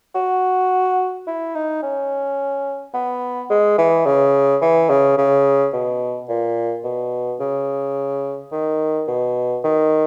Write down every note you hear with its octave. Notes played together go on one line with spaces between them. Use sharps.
F#4
E4
D#4
C#4
B3
G#3
E3
C#3
E3
C#3
C#3
B2
A#2
B2
C#3
D#3
B2
D#3